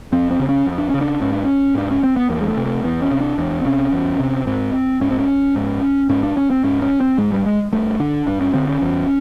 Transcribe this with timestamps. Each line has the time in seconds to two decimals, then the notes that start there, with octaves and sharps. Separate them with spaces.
0.12 F2 C4
0.30 C4
0.39 C#3
0.49 C#4
0.66 F2
0.78 D4
0.89 C#3 C#4
1.01 D4
1.21 G#2 C#4
1.32 D4
1.45 C#4
1.75 G#2 D4
1.91 C#4
2.03 C4
2.16 B3
2.30 E2 A#3
2.41 G#3
2.48 A3
2.57 C3
2.66 A3
2.84 E2 B3
3.02 C#4
3.11 C3
3.20 D4
3.38 E2 D4
3.61 C4
3.65 C3 C#4
3.92 E2
4.20 C3
4.47 G#2 C4
5.01 G#2 C#4
5.10 C4
5.19 C#4
5.56 G#2
6.09 G#2 C#4
6.23 D4
6.37 C#4
6.50 C4
6.64 G#2 C#4
6.82 C#4
7.00 C4
7.18 G#2 G#3
7.32 G3
7.46 G#3
7.73 G2 A3
7.99 D3 D4
8.27 G2 D4
8.41 C#4
8.54 D3 C4
8.68 C#4
8.81 E2